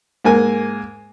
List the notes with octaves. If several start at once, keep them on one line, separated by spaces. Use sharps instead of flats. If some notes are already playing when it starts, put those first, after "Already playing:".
G#2 A#3 G#5